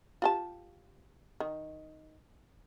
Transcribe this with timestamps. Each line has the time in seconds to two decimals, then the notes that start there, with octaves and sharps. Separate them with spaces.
0.22 F4 G4 A5
1.40 D#3